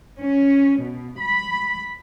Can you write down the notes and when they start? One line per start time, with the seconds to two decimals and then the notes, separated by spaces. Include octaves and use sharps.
0.20 C#4
0.81 B2
1.18 B5